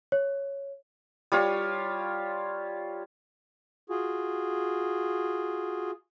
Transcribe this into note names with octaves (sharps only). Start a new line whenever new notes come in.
C#5
G3 F4 C#5
F4 F#4 G#4